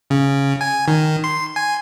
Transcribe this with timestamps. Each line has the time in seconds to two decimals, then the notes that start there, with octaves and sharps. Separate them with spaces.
0.10 C#3
0.61 G#5
0.88 D#3
1.24 C6
1.56 G#5